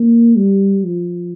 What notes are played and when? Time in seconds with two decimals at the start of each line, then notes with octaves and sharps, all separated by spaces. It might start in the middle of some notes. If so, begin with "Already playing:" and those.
Already playing: A#3
0.36 G3
0.84 F3